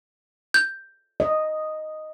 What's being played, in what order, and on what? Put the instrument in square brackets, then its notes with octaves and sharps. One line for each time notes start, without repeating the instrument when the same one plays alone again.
[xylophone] G6
[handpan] D#5